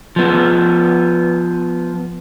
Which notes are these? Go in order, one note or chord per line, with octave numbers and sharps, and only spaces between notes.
F3 B3